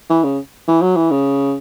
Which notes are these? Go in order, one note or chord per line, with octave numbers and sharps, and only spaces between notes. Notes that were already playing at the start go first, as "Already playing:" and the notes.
E3
C#3
E3
F#3
E3
C#3